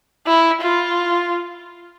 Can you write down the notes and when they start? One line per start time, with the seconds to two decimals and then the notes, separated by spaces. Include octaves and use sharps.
0.27 E4
0.61 F4